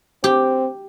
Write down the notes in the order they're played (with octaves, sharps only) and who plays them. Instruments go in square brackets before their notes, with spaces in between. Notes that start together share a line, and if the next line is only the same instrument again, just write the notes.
[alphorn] C4 [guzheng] G4